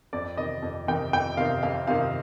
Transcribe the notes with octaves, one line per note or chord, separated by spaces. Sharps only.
F2 D5
C3 D#3 D#5
F2
C3 D#3 G5
F2 G5
C3 D#3 F5
F2 F5
C3 D#3 F5